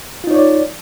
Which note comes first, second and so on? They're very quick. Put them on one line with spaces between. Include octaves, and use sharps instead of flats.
F4 D#4 C#5 D5